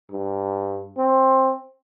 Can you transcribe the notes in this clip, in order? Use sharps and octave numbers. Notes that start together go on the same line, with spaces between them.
G2
C4